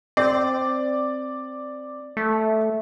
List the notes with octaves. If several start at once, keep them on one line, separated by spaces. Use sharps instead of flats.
C4 D5
A3